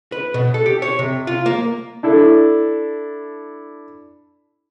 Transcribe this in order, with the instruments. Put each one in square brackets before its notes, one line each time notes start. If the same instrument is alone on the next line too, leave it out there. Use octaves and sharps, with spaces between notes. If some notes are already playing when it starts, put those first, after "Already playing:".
[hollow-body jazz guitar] B4
B2
A4
G4
C#5
C3
F4
A#3
[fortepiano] D4 E4 A4